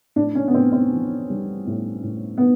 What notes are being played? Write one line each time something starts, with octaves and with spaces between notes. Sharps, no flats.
A2 D4
C#4
B3
A2 C4
C4
E3
G3
A2
A2
B3